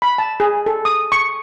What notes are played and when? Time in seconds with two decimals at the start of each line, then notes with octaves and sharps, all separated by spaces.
0.02 B5
0.18 A5
0.40 G#4
0.66 A4
0.85 D#6
1.12 C#6